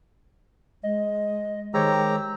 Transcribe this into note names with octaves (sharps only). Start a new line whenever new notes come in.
G#3 D#5
D#3 G#3 G4 C5 C#5 A#5 E6